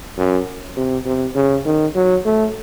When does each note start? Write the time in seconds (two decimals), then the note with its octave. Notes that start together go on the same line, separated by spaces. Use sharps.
0.18 F#2
0.77 C3
1.06 C3
1.35 C#3
1.66 D#3
1.95 F#3
2.25 A3